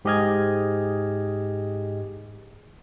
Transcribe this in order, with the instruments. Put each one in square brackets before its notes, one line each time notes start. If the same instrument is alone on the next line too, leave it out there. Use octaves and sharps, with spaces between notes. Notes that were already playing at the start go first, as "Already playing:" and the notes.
[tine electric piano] G#2 G4 G#4 D#5 F6 G#6